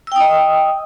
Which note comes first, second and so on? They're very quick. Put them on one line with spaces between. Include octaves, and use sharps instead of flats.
E6 G5 D#6 D#5